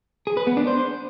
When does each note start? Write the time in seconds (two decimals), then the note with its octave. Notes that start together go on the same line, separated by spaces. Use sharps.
0.27 G#4
0.37 B4
0.47 B3
0.57 D4
0.67 C5